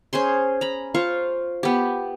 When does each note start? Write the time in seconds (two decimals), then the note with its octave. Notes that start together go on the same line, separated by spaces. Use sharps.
0.13 C#4 G#4 C5 C6
0.61 A#5 B5
0.94 F4 C5 F5 C#6
1.63 B3 G4